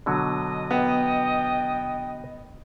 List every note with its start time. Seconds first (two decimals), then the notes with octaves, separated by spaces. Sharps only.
0.06 B2 D3 F#3 D#5
0.71 B3 G5